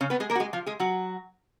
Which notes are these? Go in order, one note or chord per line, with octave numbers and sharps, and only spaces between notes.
C#3 C#4
B3 B4
G#3 G#4
A#3 A#4
F#4
G#3 G#4
F3 F4
G#3 G#4
F#3 F#4